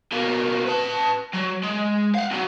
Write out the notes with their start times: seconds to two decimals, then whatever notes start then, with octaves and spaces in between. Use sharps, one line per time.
0.12 B2 A#3
0.66 B4 A5
1.34 F#3
1.63 G#3
2.15 F5 F#5
2.31 E2 F#3